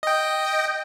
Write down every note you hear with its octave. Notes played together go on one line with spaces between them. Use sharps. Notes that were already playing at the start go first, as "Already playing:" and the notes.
D#5 G5